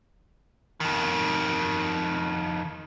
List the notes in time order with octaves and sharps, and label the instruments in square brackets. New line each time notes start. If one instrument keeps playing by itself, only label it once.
[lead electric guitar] F2 D#3